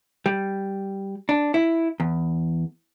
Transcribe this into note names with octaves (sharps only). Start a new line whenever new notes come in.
G3
D4
E4
E2